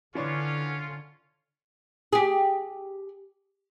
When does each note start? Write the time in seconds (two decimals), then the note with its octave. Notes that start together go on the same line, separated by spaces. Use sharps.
0.15 D3 E3 C#4 D4 F4 C#5
2.13 G4 G#4